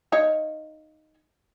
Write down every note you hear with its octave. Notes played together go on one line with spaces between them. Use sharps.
D#4 C#5 F5